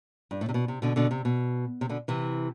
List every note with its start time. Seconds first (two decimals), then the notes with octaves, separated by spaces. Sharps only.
0.31 G2
0.41 A2
0.49 C3
0.54 B2
0.68 C3
0.82 B2 D3
0.96 B2 D3
1.11 C3
1.25 B2
1.81 C3
1.89 B2 D3
2.08 C3 E3